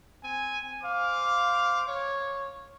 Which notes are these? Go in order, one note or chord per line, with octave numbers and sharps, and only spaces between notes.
C4 G#5
C5 F5 D6
C#5